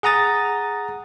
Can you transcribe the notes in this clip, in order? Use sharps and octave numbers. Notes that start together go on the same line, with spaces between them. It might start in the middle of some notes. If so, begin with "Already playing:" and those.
G#4 F#5 A#5 D#6 A6